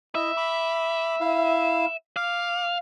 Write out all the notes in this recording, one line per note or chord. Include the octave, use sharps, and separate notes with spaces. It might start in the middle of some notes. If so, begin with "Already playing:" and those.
E4 D#5 E5
B5 D6
E4 F5
F5 D6